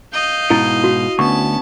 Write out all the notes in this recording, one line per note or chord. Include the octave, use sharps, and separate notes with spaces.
D#5 F5 G6
G#2 B2 E4
F#4
D2 B3 C#4 A5 C#6